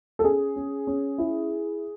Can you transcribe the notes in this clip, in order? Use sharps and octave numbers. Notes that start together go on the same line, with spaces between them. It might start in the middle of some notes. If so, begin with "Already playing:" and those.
A4
C#4 G#4
C#4
C#4
E4